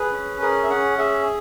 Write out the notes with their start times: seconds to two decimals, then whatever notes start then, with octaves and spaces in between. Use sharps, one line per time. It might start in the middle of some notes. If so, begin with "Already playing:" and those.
Already playing: G#4 B4
0.12 C#4
0.41 G#4 A#4
0.63 E5
0.70 C#4 F#5
0.98 G#4 E5